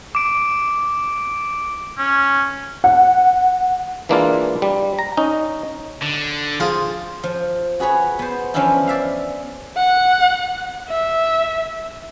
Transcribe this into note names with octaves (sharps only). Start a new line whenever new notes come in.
D6 D7
C#4
F#5
E3 G#3 A#3 D4 E4 F4
G3
A#5
C#4 D#4
D3
F3 F4 G#4 A5
F3
F#4 G#4 B4 C#5
B3 C5
E3 F3 C#4 D4 E4 F4
D5 E5 F5
F#5
E5